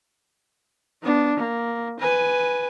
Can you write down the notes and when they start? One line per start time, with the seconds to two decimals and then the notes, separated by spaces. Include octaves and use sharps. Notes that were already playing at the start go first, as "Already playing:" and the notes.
1.02 B3 D4
1.37 A#3
1.99 B4 G#5